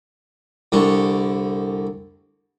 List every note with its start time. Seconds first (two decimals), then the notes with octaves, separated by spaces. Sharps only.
0.72 C2 D3 C#6